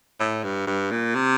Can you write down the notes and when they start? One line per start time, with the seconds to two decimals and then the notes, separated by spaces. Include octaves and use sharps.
0.20 A2
0.44 G2
0.67 G2
0.91 A#2
1.15 C3